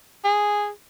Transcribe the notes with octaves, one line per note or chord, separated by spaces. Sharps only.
G#4